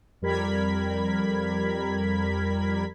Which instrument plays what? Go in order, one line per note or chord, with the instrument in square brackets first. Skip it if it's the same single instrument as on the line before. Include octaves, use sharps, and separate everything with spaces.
[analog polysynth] F2 G3 A#4 B5 G#6 B6